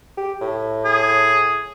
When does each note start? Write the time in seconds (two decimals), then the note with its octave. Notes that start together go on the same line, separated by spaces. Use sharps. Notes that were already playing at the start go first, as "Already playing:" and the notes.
0.17 G4
0.41 A2
0.85 G#4